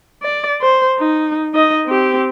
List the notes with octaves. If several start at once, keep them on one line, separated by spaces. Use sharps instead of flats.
D5
C5
D#4
D#4 D#5
C4 G4